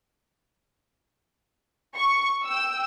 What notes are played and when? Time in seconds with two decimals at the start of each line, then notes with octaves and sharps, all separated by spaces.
1.95 C#6
2.45 G5 E6